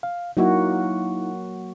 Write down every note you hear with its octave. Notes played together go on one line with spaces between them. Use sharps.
F5
F#3 A#3 D#4 E4 F#4